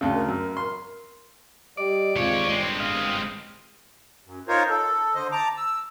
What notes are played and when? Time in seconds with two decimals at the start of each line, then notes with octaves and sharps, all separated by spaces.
0.01 D2 C#3
0.14 A#4
0.28 F#2
0.57 C6
1.77 G3 G4 D5 D#5
2.16 D#2 G#3 C4 F4 C#5
2.49 G1 G#3 C4
2.80 D#5 F5
4.26 F#2
4.48 D#4 F4 A#4 C5 C#5
4.69 A4
5.15 D3 C5 D#5
5.32 A5 A#5 D6
5.57 E6